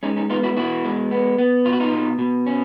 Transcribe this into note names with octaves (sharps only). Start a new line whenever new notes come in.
G#3 C#4 D#4
C#4 D#4
B3 D#4 F4
E4 F#4
B2 E4 F#4
G#3
B3
B3
B2 F4
F#4
D#4 F4
B2
B2
C#4